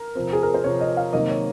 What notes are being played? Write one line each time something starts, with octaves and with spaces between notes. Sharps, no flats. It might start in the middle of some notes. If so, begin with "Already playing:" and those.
Already playing: A#4
C3 F3 C4
G#4
A#4
C5
C3 F3 C4 C#5
D#5
F5
C3 D#3 F#3 A#3 D#5
C#5